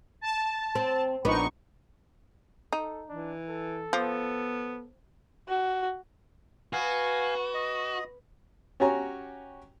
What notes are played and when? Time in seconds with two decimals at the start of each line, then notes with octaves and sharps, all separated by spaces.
0.21 A5
0.75 C4
1.25 A#1 B3 D4 D#4 C#6
2.73 D#4 A4
3.09 E3 D4
3.49 A4
3.93 F3 B3
5.48 F#4
6.73 B3 F#4 F5 G#5
7.54 D#5
8.80 C#4 F#4 G4 C#5 G#5 A#5